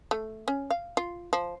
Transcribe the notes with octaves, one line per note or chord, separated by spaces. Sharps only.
A3
C#4
F5
F4
F3